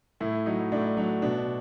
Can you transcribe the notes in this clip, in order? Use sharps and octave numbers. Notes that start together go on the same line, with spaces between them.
A2 E4
F#3 D#4
A2 D4
F#3 D4
B2 D4